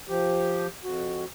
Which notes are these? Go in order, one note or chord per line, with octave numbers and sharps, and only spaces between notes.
F3 G4
F2 F#4